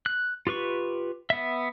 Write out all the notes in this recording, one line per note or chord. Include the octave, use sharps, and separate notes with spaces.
F#6
F4 G4 B4 C#6
B3 E5